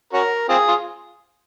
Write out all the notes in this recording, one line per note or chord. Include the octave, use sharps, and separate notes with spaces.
C#4 F#4 A#4
C4 F4 G#4
F4